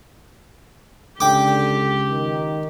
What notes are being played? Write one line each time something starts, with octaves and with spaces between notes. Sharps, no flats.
C#2 D3 G4 G5 D6
D#3